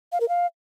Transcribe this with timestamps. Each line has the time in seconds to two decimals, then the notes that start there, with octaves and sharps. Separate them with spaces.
0.12 F5
0.21 A#4
0.29 F5